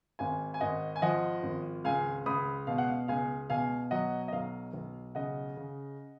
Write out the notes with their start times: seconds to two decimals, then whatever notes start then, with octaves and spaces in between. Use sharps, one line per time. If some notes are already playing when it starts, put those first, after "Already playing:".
0.19 G#1 F5 G#5
0.54 G#5
0.60 G#1 D#5 F#5
0.96 G#5
1.02 F3 D#5 F#5
1.43 G#1
1.84 C#2 F5 G#5
2.26 C#2 B5 D#6
2.67 B2 F5
2.78 F#5
2.88 F5
3.08 C#2 F5 G#5
3.50 B2 F5 G#5
3.91 F#3 D#5 F#5
4.28 D#5
4.32 B1 F5
4.74 B1
5.15 C#3 D#5 F#5
5.57 C#3